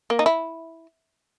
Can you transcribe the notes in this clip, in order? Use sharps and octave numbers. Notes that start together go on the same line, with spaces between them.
A#3
D#4
E4